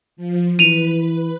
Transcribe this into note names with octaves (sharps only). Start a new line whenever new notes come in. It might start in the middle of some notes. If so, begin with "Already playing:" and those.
F3
E3 B4 D#7 F7